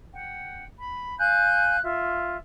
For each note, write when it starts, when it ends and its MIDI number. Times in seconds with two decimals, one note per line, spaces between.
0.12 0.64 78
0.12 0.64 79
0.78 1.14 83
1.19 1.78 77
1.19 1.78 80
1.19 1.78 90
1.19 1.78 91
1.84 2.38 65
1.84 2.38 76